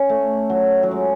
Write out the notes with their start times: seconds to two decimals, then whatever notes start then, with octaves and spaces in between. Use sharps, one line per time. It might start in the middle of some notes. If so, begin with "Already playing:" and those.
Already playing: C#4
0.09 A3
0.50 F#3
0.83 F#3
0.91 G#3